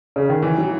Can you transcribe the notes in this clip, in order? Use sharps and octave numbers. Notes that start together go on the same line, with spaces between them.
C#3
D#3
E3
F#3